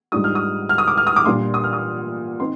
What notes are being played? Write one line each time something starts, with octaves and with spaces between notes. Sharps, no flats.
G#2 G3 D4 F4 D#6
F6
D#6
F6
D#6
D6
F6
D#6
D6
A#2 G3 A#3 D4 F4 C6
D#6
F6
D#6
C4 D#4 C6